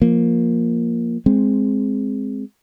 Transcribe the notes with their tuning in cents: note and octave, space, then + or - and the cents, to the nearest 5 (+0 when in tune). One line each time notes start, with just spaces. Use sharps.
F3 +0 A#3 +0
G#3 +0 C4 +0